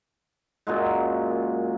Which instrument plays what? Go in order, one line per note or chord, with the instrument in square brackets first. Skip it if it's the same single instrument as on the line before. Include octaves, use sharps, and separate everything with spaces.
[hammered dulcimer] F#2 A#2 F#3 G#3